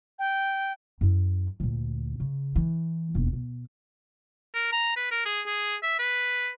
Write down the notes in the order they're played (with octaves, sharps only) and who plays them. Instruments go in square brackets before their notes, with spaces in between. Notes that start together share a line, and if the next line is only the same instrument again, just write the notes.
[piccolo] G5
[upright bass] F#2 E4
D2 A#2
C#3
E3
E1 D#2
B2
[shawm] A#4
A#5
B4
A#4
G#4
G#4
E5
B4